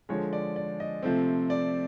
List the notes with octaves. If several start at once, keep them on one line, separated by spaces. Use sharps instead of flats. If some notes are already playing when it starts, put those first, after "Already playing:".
D3 F3 G#3 C#5
D5
D5
D#5
C3 F3 A3 C4
D5